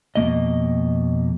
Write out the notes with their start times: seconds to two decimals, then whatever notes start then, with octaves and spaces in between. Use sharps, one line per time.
0.15 F2 B2 A#3 D#5